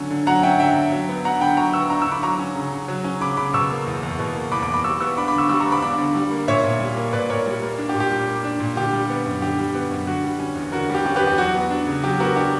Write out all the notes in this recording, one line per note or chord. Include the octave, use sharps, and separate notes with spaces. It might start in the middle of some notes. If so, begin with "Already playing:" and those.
Already playing: D3 F#3 C#4
D3
F#3 F#5 A#5
C#4 E5 G5
D3 E5 G5
D3
F#3
B3
D4 F#5 A#5
D3 G5 B5
F#3 A#5 C#6
B3 C#6 E6
D4 A#5 C#6
C#6 E6
D3 B5 D6
F#3 A#5 C#6
C#4
C#3
C#3
F#3
C#4
C#3 B5 D6
C#3 B5 D6
B2 C#6 E6
A#3
E2
E2
B2
A#3
E2 B5 D6
B5 D6
E2
B5 D6
G3 C#6 E6
B3 C#6 E6
D4 B5 D6
B5 D6
D3
C#6 E6
G3 C#6 E6
A#5 C#6
B3
B5 D6
D4 B5 D6
D3
G3
A#3
A#2 C#5 E5
A#2
G3
A#3
A#2 B4 D5
A#2 A#4 C#5
G3
A#3
D4
G4
A#2
G4
G3
A#3
D4
A#2
D3 G4
G3
B3
F#2
D3 G4
G3
B3
F#2
D3 F#4
G3
C#4
E2
D3 F#4 A#4
G3
G4
C#4 G4
G4 B4
E2
G4
F#3 F#4
B3
D4
C#3
F#3 G4
B3 F#4 A#4
D4 G4